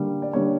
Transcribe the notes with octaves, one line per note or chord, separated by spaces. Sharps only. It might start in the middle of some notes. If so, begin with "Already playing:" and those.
Already playing: D3 G3 A#3
D5
D3 G3 A#3 C#5